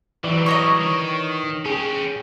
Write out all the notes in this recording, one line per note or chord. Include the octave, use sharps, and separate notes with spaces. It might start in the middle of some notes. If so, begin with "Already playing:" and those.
E3 F#3 G3 D5
C#5 D#5 A#5
D#3
C#4 G4 G#4